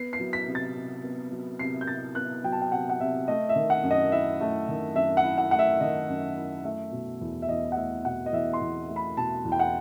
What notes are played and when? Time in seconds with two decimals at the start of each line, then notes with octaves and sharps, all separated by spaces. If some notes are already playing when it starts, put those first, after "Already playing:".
Already playing: B3 C7
0.13 C7
0.20 F#3
0.33 B6
0.47 C3
0.55 A6
0.76 C3
1.04 B3
1.32 F#3
1.59 C3 C7
1.81 G6
1.88 C3 A6
2.15 B3 F#6
2.44 F#3 G5
2.52 A5
2.62 G5
2.71 C3 F#5
2.89 F#5
2.99 C3 E5
3.28 A3 D#5
3.49 E5
3.56 D#3
3.70 F#5
3.84 F#2
3.91 D#5
4.12 E4 E5
4.41 A3
4.69 D#3
4.96 F#2 E5
5.17 F#5
5.24 E4
5.38 F#5
5.51 A3 F#5
5.59 E5
5.80 D#3 D#5
6.09 F#2
6.37 E4
6.64 A3 E5
6.92 B2
7.21 E2
7.42 E5
7.49 E2 D#5
7.72 F#5
7.76 A3 E5
8.05 B2 F#5
8.26 D#5
8.33 E2 E5
8.53 C6
8.61 E2
8.88 A3
8.96 B5
9.17 B2 A5
9.45 E2
9.52 G5
9.59 F#5